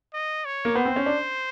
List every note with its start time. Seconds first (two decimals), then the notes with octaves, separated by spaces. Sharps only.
0.14 D#5
0.45 C#5
0.65 A#3
0.75 B3 C5
0.85 C4
0.96 C#4
1.06 D4